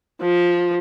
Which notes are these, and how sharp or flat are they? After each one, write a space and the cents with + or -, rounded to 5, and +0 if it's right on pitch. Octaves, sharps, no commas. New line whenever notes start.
F3 +10